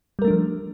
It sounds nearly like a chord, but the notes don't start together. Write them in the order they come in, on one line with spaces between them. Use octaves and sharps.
G3 A#4 A3 D4 F3